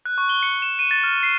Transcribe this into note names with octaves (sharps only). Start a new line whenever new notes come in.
F#6
C#6
G7
C#7
E7
D#7
A6
F6
C7